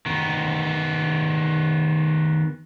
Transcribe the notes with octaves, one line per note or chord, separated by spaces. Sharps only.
D#3 B3